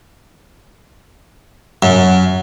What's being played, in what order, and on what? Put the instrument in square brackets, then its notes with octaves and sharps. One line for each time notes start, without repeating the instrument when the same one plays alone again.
[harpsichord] F#2